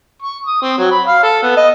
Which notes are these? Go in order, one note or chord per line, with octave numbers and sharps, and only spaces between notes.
C#6
D#6
C4
F#3
B5
F5
A4
B3
D#5